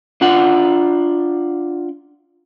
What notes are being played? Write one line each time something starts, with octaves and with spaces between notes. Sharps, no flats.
D4 F4 F#5